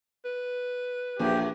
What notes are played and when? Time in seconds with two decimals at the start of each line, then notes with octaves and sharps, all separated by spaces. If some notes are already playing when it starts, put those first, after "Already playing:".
0.25 B4
1.19 A#1 E2 G4 G#4